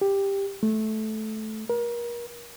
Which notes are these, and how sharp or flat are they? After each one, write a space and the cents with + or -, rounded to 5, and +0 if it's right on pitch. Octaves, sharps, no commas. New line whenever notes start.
G4 +10
A3 -15
A#4 +30